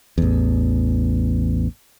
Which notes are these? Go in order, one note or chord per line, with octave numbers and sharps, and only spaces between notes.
A1 E2